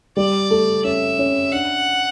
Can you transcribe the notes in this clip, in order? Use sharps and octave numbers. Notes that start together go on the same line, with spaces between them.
G3 D5
A3
C#4 E5
C#4
D4 F#5